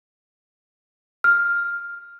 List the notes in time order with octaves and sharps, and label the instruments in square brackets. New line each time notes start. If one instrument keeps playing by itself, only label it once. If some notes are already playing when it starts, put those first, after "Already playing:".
[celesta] F6